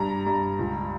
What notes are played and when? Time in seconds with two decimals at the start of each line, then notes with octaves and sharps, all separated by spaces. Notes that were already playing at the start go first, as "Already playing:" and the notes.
Already playing: G2 A#5
0.27 G2
0.59 C#2